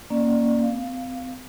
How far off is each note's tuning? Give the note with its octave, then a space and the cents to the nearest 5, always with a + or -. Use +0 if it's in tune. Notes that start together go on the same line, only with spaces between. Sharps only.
A#3 +0 C#4 +0 D5 +20
C4 -40 F5 +0